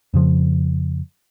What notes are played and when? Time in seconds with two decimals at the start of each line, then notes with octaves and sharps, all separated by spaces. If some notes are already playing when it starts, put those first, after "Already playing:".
0.14 F2 C#3 F3